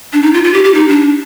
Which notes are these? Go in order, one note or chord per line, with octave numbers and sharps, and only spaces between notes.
D4
D#4
F4
F4
G4
G4
D#4
D4